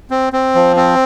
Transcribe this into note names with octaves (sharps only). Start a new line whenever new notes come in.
C4
C4
F3
C4